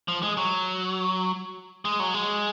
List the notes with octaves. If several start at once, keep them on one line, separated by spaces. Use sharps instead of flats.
F3
G#3
F#3
G#3
F#3
G#3